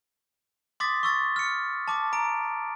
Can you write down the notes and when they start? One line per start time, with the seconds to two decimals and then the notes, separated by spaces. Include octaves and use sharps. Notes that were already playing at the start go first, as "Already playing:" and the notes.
0.80 C6 D6 D#6 A6 B6
1.03 C#6 E6 A6
1.36 F6 C#7
1.88 A5 D6
2.13 A#5 D7